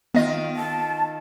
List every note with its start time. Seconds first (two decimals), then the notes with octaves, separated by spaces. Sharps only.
0.14 D#3 B3 F4 D#5
0.56 A5